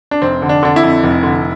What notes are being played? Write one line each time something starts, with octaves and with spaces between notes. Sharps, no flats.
D4
F1 C4
D3
D4
D3 D4
E4
F2
F1
D3